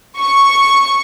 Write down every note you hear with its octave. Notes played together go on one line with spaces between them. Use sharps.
C#6